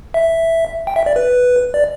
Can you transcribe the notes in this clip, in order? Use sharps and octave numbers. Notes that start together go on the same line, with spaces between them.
E5
G5
E5
D5
B4
D5